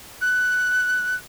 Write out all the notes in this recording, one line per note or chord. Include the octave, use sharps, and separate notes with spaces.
F#6